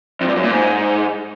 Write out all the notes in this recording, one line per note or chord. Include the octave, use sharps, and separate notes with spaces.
F2
G2
F#2
A#2
G#2